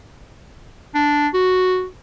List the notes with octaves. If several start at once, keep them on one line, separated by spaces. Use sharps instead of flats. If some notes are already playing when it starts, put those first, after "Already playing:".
D4
F#4